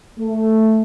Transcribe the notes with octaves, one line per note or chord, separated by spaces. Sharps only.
A3